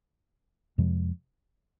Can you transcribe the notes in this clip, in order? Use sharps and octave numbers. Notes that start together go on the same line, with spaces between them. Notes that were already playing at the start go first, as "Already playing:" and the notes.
F2 C3 F3 G#3